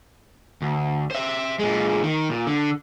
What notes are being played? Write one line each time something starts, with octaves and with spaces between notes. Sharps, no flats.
D2
C5 E5
A#2 G#3
D#3
A#2
D3